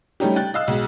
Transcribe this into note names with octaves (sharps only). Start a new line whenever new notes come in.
G3 A3 C#4 D#4 G4
G5 F#6 A6
D#5 F5 E6
B1 G#3